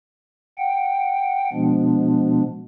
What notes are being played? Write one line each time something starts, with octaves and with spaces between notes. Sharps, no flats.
F#5 G5
B2 F3 G#3 B3 D4